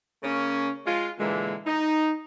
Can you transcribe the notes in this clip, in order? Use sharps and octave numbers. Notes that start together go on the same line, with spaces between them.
C#3 A#3 C#4
G#3 F4
A#2 D3 E3 G#3 A#3
D#4